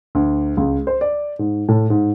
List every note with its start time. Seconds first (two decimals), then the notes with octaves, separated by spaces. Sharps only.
0.15 D2
0.57 C#2
0.87 C5
1.01 D5
1.39 G#2
1.68 A2
1.90 G#2